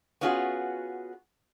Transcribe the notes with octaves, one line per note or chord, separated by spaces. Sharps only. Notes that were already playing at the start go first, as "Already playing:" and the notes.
B3 C#4 F4 F#4 G#4